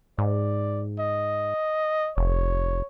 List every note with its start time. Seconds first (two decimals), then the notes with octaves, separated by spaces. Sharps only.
0.18 G#2 D5
0.99 D#5
2.17 F1 C#5